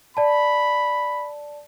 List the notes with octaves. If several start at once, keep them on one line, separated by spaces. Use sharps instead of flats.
D5 A5 B5